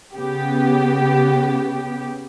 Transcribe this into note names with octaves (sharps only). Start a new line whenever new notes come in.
C#3 B3 G4